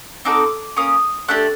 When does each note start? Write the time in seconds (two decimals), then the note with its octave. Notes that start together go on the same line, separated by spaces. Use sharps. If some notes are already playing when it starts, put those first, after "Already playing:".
0.25 C4 D#4 F#4 A4 D6
0.76 A#3 C#4 D#6
1.28 A3 D4 G4 F#6